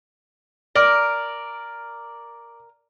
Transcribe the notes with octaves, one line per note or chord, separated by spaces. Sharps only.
A#4 D5